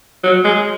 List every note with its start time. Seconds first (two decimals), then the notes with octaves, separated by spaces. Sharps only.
0.24 F#3
0.45 G#3